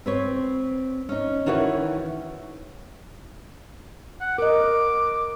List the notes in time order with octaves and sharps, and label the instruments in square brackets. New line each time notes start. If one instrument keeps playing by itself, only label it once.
[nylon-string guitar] C4 B4 C#5
C#4 D#4
D#3 E3 F#4 B4 C#5
[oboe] F#5
[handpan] A#4 D#5 [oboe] D6